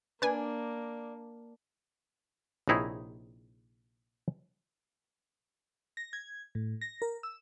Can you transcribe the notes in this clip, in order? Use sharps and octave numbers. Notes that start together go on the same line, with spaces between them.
A#3 D4 B4 G#5
A#1 C3 D#4 E4 G#4 C#5
A#6
G#6
A2
A#6
A#4
E6